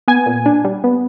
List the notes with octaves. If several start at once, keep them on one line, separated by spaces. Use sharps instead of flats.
B3 G#5
A#2
D4
G3
B3